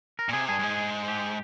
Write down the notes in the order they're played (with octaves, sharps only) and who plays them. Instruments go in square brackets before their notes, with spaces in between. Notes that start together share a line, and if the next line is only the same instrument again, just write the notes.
[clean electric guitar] A#4
[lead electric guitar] A#2
[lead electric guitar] C3 [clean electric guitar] G#4
[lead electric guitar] G2 [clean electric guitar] G#4
[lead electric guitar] G2
G#2
[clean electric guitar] G4